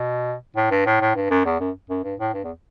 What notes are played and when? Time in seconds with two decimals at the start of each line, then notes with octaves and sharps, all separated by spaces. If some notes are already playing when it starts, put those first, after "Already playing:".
Already playing: B2
0.56 A2
0.71 G2
0.86 A2
1.01 A2
1.16 G2
1.30 F#2
1.45 E2
1.60 F#2
1.90 F#2
2.04 G2
2.19 A2
2.34 G2
2.44 E2